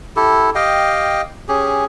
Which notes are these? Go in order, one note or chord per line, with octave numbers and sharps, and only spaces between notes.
E4 G4 A4
G4 D#5 F5 G5
C#4 G4 G#4